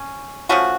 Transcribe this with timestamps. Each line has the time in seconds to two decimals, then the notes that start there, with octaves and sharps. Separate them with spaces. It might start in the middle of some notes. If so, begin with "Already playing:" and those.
Already playing: C#4
0.49 F3 A3 C#4 F#4